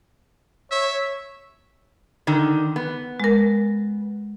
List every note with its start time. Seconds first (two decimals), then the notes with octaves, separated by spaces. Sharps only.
0.71 C#5 E5
2.27 D3 D#3
2.76 B3
3.20 G#3 A#4